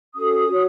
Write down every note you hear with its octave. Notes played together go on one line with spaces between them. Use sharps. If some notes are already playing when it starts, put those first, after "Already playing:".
C#4 F#4 A4 D#6
F#4 C#5